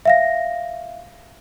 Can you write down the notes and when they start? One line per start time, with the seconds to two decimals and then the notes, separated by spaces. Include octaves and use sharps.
0.05 E5 F5 A#6